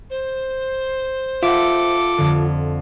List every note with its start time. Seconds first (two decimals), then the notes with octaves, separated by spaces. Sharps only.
0.10 C5
1.43 F4 A4 E5 F#5 D6
2.18 F2 D3